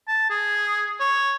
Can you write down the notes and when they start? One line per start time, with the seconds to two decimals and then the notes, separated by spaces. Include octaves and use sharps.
0.08 A5
0.30 G#4
1.00 C#5